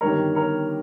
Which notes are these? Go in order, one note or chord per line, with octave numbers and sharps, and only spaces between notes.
G1 G2 D#3 G3 A#4 C#5
A#4 C#5